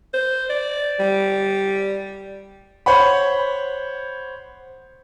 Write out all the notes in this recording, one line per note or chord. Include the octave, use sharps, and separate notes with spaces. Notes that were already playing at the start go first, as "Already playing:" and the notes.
C5
D5
G3
C5 C#5 F#5 B5